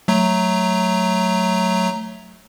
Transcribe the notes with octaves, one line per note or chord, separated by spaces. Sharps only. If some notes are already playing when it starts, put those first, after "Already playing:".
F#3 A3 A#5